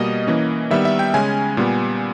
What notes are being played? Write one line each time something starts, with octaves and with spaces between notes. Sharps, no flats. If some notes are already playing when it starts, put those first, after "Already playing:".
Already playing: B2 G3 A#3 D#5
E3 A#3 C#4
D#3 G3 B3 E5
E5
G5
C#3 G#3 C#4 G#5
A#2 G3 B3